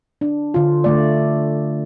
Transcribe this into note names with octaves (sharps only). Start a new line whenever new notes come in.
D4
D3 F4
D3 A3 D5